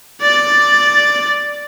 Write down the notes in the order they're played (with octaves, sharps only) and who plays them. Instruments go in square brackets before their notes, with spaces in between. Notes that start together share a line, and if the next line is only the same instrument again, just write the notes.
[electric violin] D5 A6